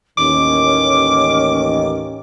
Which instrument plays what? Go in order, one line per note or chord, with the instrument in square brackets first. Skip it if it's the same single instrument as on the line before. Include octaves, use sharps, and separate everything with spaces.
[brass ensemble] A1 D#2 D#3 [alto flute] C#4 [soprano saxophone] D6